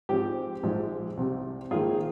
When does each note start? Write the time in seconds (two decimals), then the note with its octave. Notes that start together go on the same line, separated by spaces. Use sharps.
0.09 G#2 F3 C4 G4
0.63 A#1 G#2 F3 G#3
1.17 C2 C3 G3
1.71 A#1 G#2 D#3 A#3 F4 G#4